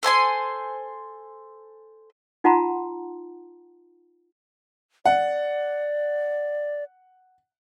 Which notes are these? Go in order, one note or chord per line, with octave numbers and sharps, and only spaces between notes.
A4 C5 G#5 C6
D#4 F4 F#5 A5 A#5 C6
D5 F#5